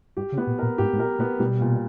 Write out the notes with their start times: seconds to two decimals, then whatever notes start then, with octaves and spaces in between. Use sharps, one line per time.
0.17 G2 G4
0.32 C#3
0.37 B3
0.47 A#2
0.59 A#2 A#4
0.78 G#2 G4
0.93 G#2
0.99 A#2 A#4
1.19 A#2 B3
1.40 B2 G3
1.61 A#2